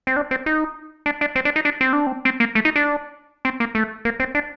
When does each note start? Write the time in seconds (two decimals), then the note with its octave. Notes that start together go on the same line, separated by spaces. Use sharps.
0.07 C4
0.16 D4
0.31 C4
0.46 D#4
1.06 D4
1.21 D4
1.36 C4
1.45 D4
1.56 D#4
1.65 D4
1.81 C4
1.93 D4
2.07 C4
2.25 C4
2.40 A#3
2.55 A3
2.65 D#4
2.76 D4
3.45 C4
3.60 A#3
3.75 A3
4.05 A#3
4.20 C4
4.35 D4